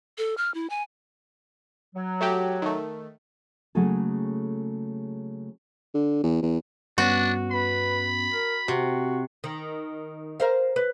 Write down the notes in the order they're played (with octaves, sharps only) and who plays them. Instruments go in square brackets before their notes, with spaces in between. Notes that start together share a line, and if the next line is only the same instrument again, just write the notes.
[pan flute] A4
F6
E4
G#5
[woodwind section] F#3
[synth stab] A3 F#4 G4
D#3 A3
[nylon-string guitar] C#3 F#3 A3 A#3 G#4 A4
[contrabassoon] D3
E2
E2
[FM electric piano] G2 B3 C#4 [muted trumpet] D4 [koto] F#4
[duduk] B4 [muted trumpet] B5
[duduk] A#4
[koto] C3 [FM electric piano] C4 [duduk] F#4
[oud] D#3
A#4 C5 F5
B4